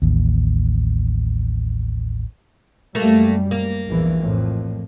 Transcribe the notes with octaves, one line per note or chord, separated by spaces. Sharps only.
A1 D#2
F#2 G3 A3 A#3
A#3
A#1 E2 E3
F2 A2